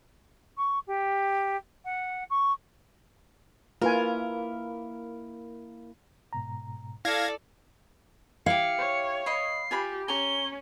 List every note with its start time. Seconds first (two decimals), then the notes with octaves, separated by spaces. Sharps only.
0.57 C#6
0.87 G4
1.85 F#5
2.30 C#6
3.82 A#3 E4 F4 A#4 B4 G#5
6.33 G#2 B2 A#5
7.05 E4 A4 D5 F5 G#6 A#6
8.46 E4 G4 F5 C#7
8.78 C#5
9.26 D#5 B5 C7
9.71 F4 G4 G#5 B5
10.08 C#4 G#5 A#5 C#6 G7